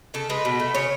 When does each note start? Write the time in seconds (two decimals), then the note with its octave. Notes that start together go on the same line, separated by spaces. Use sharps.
0.14 C#3 A4
0.30 G#3 B4
0.45 B2
0.60 A3
0.75 C#3 C#5